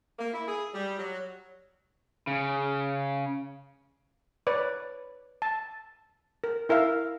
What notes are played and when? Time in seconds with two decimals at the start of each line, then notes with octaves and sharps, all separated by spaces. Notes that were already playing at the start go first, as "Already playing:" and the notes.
0.19 A#3
0.33 E4
0.47 G#4
0.74 G3
0.99 F#3
2.27 C#3
4.47 B4 C#5 D5
5.42 A5
6.44 A#4
6.69 E4 A#4 E5 F5